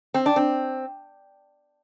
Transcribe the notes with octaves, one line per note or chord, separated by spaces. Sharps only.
C4
D4
C4